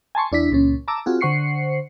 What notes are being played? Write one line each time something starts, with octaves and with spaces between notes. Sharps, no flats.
G#5 A5 C6 C#6
E2 D4 E4 B6
C#2 A#2 C#4
A5 A#5 D6 E6
C4 F4 F#4 G#4
D3 C5 F#5 C#6 C7 C#7